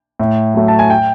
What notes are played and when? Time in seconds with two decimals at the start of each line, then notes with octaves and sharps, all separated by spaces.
0.20 A2
0.54 F#3 A3
0.68 A5
0.79 G#5
0.90 G5